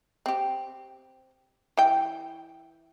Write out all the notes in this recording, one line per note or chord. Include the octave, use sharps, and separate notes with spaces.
C4 G4
E3 G5